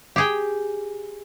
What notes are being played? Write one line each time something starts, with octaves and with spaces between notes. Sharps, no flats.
G4 G#4 G5